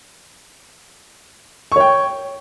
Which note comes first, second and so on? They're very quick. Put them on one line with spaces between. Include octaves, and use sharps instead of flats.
C#6 C#5 G5